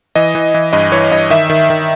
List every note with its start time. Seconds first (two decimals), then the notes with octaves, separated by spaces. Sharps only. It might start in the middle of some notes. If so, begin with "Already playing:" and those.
0.15 E3 D#5
0.35 E3
0.54 E3
0.73 G2 D#5
0.92 E3 C#5
1.11 G2 D#5
1.30 D#3 E5
1.50 D#3
1.70 D#3